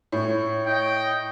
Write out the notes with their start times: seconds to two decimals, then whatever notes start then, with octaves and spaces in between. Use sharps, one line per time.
0.12 A2 C#5
0.67 D#5 G5